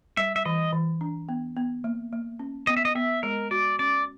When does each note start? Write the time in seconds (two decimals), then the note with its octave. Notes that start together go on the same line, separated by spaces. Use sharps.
0.17 G3 E5
0.36 E5
0.45 E3 D#5
0.73 E3
1.01 D4
1.29 B3
1.56 B3
1.84 A#3
2.13 A#3
2.39 C#4
2.67 B3 D#5
2.77 E5
2.85 D#5
2.95 B3 E5
3.23 G#3 A#4
3.51 F#4 D5
3.79 C#4 D5